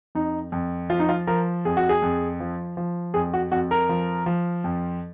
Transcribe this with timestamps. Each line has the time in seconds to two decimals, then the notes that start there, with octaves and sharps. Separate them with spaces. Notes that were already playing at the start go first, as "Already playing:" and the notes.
0.15 F2 D#4
0.52 F2
0.90 F3 F4
1.00 D#4
1.09 F4
1.27 F3 A#4
1.65 F2 G#4
1.77 F#4
1.89 G#4
2.02 F2
2.40 F3
2.77 F3
3.14 F2 G#4
3.34 F#4
3.51 F2 F#4
3.71 A#4
3.89 F3
4.26 F3
4.64 F2